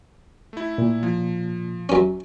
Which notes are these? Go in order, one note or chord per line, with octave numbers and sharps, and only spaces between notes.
A3 E4
A#2
F3
F#2 C#4